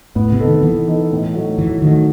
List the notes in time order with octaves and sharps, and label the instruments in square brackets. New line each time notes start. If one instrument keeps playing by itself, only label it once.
[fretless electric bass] A2 [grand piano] B3
[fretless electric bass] C3
[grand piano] D#4 A4
[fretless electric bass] D#3
[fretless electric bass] E3 [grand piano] B3
[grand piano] D#4 A4
A2
F#3 A3 D#4 F#4
[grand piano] A2 [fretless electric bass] E3
[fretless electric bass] D#3 [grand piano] F#3 A3 D#4 F#4